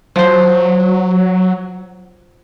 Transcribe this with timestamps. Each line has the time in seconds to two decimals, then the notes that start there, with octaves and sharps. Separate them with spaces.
0.16 F3 F#3 C5